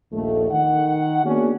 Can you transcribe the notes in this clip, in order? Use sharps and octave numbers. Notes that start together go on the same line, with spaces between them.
A#1 D#2 A3
D#3 F#5
A#3 B3 C#4 D4 F#4 G#4